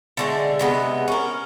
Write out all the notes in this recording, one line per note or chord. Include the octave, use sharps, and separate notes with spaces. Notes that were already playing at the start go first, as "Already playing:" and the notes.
D3 G#3 A3
C3 G#3 B3
C#4 A#4